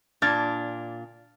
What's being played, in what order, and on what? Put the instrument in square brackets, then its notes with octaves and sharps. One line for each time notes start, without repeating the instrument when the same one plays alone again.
[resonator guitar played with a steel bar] A#2 D4 [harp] F6 G#6 A6